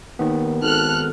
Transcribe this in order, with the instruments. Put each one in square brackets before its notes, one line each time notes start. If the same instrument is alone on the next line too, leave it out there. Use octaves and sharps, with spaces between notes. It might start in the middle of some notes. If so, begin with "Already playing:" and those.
[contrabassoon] D#2 [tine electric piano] D#3 B3
[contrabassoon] G#1 [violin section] A4 F6 F#6